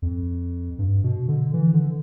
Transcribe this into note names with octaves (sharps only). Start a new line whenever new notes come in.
F2
G2
B2
D3
E3
D3